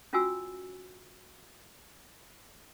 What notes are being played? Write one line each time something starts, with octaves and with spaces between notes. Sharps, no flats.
C#4 F4 F#4 G#5 E6